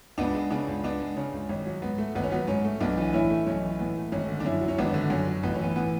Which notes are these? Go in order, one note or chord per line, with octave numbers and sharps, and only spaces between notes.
C#2 B3 D4
G#3
C#3 B3 D4
C#2
C#2 B3 D4
G#3
C#3 C#4
C#2
G#1 C#4
F#3
G#2 B3
A3
G#1 B3
C#4
F#3 B3
G#2 C#4
A3
B1 B3 D4
E3
A2 C#4 E4
A3
B1 C#4
E3
A2 B3
A3
G#1 C#4
D3
D4
F#2 C#4 E4
F#3
C#4
G#1 B3 D4
D3
F#2 C#4
F#3
A1 B3
C#4
E3 B3
A2 B3